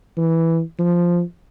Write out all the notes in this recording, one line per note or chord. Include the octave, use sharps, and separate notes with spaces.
E3
F3